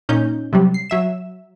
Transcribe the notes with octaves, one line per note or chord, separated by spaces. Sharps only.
A#2 C#4 D#4 G6
C3 F#3 G3
C7
F#3 E5 E7